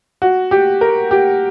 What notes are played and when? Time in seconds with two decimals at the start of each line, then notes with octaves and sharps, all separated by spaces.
0.22 F#4
0.51 G4
0.81 A#4
1.11 G4